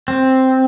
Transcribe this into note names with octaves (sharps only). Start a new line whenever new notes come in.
C4